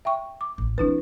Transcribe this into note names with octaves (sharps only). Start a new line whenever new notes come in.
E5 G5 C#6
D6
A1
F3 C4 D4 E4 B4